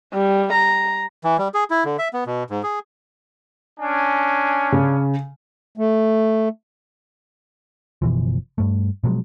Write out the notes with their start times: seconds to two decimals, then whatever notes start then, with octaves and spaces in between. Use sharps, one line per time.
0.14 G3
0.53 A#5
1.24 E3
1.38 G3
1.54 G#4
1.70 E4
1.85 D3
1.98 E5
2.13 B3
2.26 B2
2.50 G#2
2.63 G#4
3.80 C#4 D4 G#5
4.72 C#3
5.77 A3
8.02 F#1 B2 E3 F3
8.58 G2 A3
9.04 B2 F3 F#3 G#3